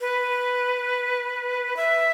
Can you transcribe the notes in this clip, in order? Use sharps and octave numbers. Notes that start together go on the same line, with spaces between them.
B4
E5